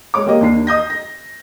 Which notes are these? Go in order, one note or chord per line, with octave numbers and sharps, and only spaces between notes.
G#3 C#5 D6
A#3 G4 D#5
D#2 D4 C7
D#5 D#6 G6 A#6
A#6